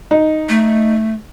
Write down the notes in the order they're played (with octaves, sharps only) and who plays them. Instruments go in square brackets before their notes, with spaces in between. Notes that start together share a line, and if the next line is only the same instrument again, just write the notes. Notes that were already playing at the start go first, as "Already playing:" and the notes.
[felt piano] D#4
[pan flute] A3